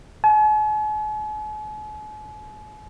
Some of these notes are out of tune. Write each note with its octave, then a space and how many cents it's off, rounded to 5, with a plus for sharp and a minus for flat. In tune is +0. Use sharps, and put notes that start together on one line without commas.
G#5 +45